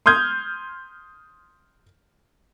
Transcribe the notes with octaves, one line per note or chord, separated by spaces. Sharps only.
C6 D#6 F6 G6 G#6